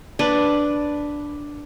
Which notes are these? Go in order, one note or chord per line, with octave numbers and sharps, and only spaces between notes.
D4 B4